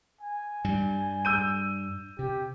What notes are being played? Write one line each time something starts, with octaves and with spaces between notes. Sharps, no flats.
G#5
G2 G3
E6 G6 D#7
C3 G4